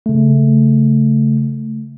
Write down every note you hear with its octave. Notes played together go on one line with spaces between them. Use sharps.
C#3 A3